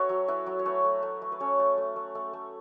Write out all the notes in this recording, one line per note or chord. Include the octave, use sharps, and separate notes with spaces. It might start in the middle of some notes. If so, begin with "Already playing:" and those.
Already playing: C#4 F#4 A4 B4 C#5 E5
F#3
E4 B4 E5
F#3
C#5
A3 B4 E5
A3
A3
A3
B4
C#4 A4 C#5
A3
A3
A3
A3 A4
A3